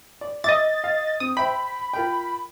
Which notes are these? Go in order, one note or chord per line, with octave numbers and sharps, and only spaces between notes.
D5
D#5 E5 D6 A6
F5
C4 D#6
C5 E5 G5 B5
F4 A#4 G5